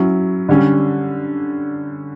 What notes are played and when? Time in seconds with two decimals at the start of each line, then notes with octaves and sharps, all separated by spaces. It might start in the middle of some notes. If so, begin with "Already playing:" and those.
Already playing: F#3 C#4 E4
0.49 D3 G3 C#4